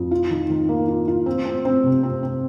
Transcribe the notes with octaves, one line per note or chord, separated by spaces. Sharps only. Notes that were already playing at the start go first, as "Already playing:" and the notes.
Already playing: F2
F4
D#3
D#3
A#3
F4
F4
C4
C4
C4
C3
C4
C4